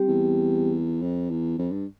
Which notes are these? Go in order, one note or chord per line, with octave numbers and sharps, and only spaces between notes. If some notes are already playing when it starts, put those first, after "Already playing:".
Already playing: G3 C4 G4
E2
F2
E2
F2
G2